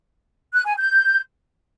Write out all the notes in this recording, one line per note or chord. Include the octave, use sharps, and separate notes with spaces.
F#6
G#5
G6